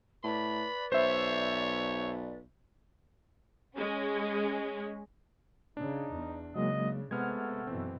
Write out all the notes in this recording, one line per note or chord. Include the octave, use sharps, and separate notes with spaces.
A2 B4 D5 B5
B1 C5 C#5 E5
G#3 C#4
C#3 D4 D#4
E2
C#3 F#3 G#3 A#3 D#5
C3 G#3 A3 B3 F#5 F6 G#6
F#2 B2 E3 C4